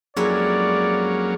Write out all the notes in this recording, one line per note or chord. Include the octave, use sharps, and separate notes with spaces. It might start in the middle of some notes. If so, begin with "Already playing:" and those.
F2 F#3 G#3 A#3 C#4 E4 D5